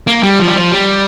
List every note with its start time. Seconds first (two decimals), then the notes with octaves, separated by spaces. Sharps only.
0.07 A#3
0.23 G3
0.39 F3
0.48 G3
0.55 F3
0.72 G3